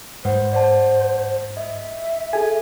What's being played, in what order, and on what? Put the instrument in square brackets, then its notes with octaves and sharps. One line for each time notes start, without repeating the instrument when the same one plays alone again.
[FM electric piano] G#2 [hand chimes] B4 F#5 [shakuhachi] C5
[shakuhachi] C5 [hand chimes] D5 F#5 A5
[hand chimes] D#5 [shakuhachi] E5
[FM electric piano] G#4 G#5 [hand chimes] A4